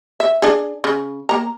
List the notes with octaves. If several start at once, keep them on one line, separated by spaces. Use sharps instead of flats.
E5
D4 G#4
C#3
A#3 A#5